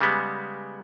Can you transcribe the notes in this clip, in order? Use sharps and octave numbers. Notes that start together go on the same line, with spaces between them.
C#3 G3 G#3 B3